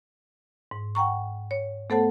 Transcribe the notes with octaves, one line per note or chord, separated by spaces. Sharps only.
G#2
F#5 G5 A#5 C#6
C#5
A3 B3 A4 C5 F#5 A5